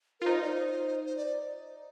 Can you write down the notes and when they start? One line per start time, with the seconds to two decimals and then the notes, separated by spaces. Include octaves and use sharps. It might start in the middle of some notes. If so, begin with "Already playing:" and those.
0.20 F4 A#4
0.25 D#4 C5
0.34 D#5
0.42 D5
0.48 C5
1.05 C5
1.16 D5